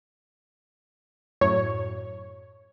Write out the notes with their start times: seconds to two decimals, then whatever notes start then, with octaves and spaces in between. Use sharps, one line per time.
1.41 F#2 A2 F#3 C#5